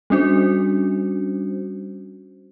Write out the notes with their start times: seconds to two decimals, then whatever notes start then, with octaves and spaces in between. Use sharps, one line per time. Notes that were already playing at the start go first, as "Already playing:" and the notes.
0.10 G3 C#4 D4 F#4 C5